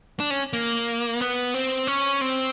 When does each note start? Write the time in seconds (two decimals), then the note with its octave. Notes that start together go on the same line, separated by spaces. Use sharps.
0.20 D4
0.30 C#4
0.53 A#3
1.20 B3
1.54 C4
1.87 C#4
2.21 C4